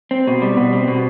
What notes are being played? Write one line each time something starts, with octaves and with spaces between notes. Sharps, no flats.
C4
B2
G3
B2
C4
B2